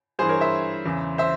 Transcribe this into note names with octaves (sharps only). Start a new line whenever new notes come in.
G2 E3 G#4 C5
A#4 C#5
C5 E5
E2 C#3 E3
C5 E5